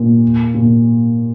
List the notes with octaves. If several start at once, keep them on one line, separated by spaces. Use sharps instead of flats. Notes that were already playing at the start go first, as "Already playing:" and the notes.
Already playing: A#2
A#2